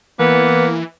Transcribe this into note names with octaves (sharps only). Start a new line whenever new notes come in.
E3 A#3 B3